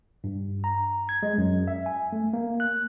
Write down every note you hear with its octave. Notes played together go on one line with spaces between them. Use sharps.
G2
A#5
G#6
G#3
F#2
E5
G#5
A3
A#3
F#6